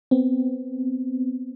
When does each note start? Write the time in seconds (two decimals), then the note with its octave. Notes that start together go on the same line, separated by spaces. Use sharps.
0.11 B3 C4